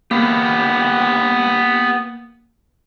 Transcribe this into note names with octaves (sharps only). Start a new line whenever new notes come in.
A#3 B3 G4